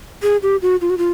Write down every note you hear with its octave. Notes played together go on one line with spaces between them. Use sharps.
G#4
G4
F#4
F4
F#4
F4